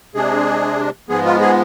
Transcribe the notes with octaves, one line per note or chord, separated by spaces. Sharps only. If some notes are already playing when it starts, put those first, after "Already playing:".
C3 G#3 D4 G#4
G#2 F3 G#3 B3 G#4
F4
G#4